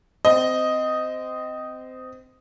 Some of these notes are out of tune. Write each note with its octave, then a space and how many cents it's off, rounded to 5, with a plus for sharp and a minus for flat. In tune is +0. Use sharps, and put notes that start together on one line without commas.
C4 -20 D#5 +0